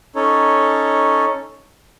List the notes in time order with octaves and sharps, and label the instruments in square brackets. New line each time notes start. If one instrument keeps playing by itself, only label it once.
[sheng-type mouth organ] C#4 D#4 A4 C#5